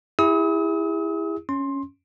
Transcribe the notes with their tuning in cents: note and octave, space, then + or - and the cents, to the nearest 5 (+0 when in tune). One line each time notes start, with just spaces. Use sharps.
E4 +0 G#4 -40 D#6 +45
C#4 +0 C6 +15